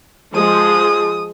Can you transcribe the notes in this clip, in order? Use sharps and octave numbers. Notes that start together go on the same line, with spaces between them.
F3 G#3 G#4 D#6